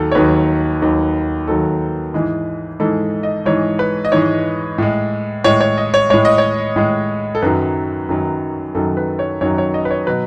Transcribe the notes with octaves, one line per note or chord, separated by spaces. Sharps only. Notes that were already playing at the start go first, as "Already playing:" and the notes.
Already playing: D#2 D#3 F#3 A4
C#5
D#2 D#3 F#3 B4
D#2 D#3 F#3
D#2 D#3 F#3 A4
G#2 E3 G#3
G#2 E3 G#3 A4
D#5
G#2 E3 G#3 C#5
B4
D#5
G#2 E3 G#3 C#5
A2 G#3
A2 G#3 C#5
C#5
D#5
C#5
A2 G#3 C#5
D#5
C#5
A2 G#3
A4
F#2 D#3 F#3 B4
F#2 D#3 F#3
F#2 D#3 F#3 A4
B4
C#5
F#2 D#3 F#3 C#5
C#5
D#5
B4
C#5
B2 F#3 B4